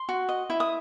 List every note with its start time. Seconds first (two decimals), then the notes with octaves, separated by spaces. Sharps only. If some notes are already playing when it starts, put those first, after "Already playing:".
Already playing: C6
0.09 F#4
0.29 D#5
0.50 E4
0.60 D#6